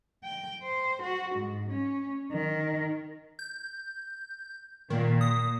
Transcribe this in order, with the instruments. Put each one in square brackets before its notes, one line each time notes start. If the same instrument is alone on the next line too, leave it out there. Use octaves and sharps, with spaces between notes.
[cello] G5
C5
F#4
G#2
C#4
D#3
[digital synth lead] G6
[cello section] A#2 [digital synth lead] D#3
[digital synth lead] D#6